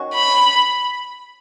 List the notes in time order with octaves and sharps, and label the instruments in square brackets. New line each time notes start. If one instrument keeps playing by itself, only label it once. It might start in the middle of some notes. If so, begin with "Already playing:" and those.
Already playing: [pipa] D#3 F#3 C#4 F#4
[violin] B5